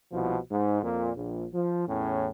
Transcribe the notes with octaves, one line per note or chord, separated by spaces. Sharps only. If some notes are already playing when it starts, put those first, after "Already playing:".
C2 B2 F3
G#2
F2 A#2
A#1
F3
E2 A2 C#4